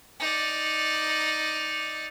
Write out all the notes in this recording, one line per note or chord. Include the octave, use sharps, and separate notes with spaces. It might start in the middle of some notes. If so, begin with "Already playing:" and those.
D#4 D5